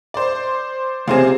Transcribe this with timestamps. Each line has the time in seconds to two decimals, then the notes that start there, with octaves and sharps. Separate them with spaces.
0.14 C5 D5
1.08 C#2 C3 G#4 C5 F5